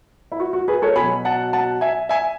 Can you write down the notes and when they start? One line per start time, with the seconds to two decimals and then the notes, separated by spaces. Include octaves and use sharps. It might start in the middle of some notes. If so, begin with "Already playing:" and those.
0.32 E4
0.40 F#4
0.53 F#4
0.68 G#4 B4
0.82 A4 C#5
0.96 B2 F#3 G#5 B5
1.25 F#5 A5
1.53 F#5 A5
1.81 E5 G#5
2.09 E5 G#5